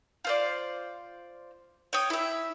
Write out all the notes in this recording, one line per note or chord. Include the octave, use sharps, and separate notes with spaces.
F4 C5 D5
C#5 G5 D#6
E4 E5